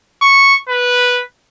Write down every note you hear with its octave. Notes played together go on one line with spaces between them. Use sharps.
C#6
B4